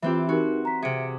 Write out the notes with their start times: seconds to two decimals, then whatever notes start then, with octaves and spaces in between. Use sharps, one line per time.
0.02 E3 C4 F4 G4 E5
0.29 D#4 F#4 G4 A#4
0.65 A#5 B6
0.82 C3 G#4 E5 C#7 D7